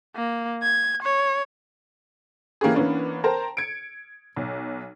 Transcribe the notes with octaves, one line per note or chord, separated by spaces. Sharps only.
A#3
G#6
C#5
E3 A#3 C#4 G4 G#4
E3 A#3 B3 C#4 D4
A#4 C5 G5 A5 A#5
G#6 C#7 D7
B1